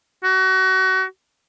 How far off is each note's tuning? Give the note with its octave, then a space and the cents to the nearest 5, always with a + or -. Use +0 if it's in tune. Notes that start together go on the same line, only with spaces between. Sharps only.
F#4 +30